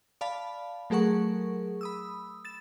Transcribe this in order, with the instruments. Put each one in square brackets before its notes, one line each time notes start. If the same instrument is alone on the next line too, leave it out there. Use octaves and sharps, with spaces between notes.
[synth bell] D5 F5 A5 B5
F#3 A3 G#4 A#4 F#5 C#6
B5 D#6 E6
A6 E7